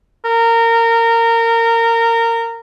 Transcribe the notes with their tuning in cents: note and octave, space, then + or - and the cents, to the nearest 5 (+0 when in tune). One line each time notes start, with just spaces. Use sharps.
A#4 -20